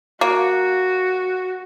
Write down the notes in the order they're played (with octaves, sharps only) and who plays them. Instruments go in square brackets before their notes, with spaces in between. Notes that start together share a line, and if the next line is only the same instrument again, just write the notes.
[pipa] A#3 [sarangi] F#4